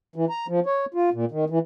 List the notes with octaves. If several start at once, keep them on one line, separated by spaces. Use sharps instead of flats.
E3
A#5
F3
C#5
F4
A#2
D#3
E3